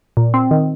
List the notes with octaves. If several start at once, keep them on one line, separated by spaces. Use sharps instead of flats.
A#2
C4
D#3